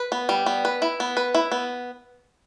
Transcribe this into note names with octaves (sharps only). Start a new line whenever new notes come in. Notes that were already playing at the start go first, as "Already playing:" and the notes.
Already playing: B4
B3
G3
B3
B4
E4
B3
B4
E4
B3